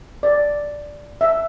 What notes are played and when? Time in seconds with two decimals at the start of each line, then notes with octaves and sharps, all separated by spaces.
0.23 D5
1.21 E5